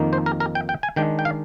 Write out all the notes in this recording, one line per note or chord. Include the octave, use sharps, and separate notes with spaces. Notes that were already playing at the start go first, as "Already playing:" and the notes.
Already playing: F2 D#3 A#3 D#4
C5
A#4
A#4
G5
G5
G#5
D#3 G#3 D4 G5
G5
F5